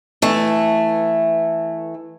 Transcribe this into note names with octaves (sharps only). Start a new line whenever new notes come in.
E3 A3